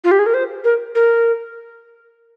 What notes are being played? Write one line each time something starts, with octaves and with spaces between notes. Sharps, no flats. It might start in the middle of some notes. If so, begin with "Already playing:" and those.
F4
G4
G#4
A#4
C5
A#4
A#4